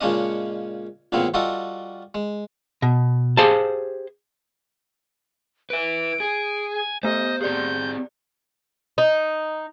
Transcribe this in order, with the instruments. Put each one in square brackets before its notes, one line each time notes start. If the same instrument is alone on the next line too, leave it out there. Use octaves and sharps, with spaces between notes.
[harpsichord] A#2 C#3 G#3 C#4 D4 D#5
A1 A#2 C#3 B3 C4 F5
G3 F4 F#4 A4 D#5 G5
G#3
[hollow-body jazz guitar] B2
G4 G#4 C5 F5 A5
[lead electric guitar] B4 E5 [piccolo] D7
[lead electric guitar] G#4
[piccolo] G#5
[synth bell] A3 B3 G4 [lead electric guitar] C5 [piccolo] D#5
[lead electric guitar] C4 G#4 [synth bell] G4 D5 [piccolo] G6
[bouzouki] D#4